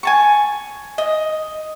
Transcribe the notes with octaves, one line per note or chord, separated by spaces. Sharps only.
G#5 A5 C#6
D#5